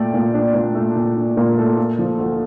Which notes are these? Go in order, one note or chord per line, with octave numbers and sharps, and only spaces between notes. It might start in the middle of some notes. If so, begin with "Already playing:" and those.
Already playing: A#2 A3 D5 G5
A#2
D4
A#2
A3
A#2
D4
A#2 A#4
A3 A4
A#3
F3
D2